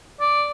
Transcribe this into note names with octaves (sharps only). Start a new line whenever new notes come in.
D5